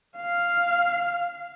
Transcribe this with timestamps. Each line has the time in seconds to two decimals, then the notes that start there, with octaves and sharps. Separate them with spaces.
0.17 F5